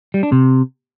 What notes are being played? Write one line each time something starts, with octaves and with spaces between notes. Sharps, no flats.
G3
D4
C3